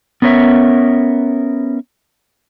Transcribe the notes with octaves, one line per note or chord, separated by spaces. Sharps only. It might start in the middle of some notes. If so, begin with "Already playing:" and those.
B3 C#4 A#4 C#5 E5